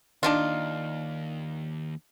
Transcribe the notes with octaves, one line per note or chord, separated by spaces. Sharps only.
D#2 D4 D#4 F4